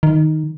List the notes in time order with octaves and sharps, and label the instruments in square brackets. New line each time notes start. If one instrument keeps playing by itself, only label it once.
[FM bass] D#3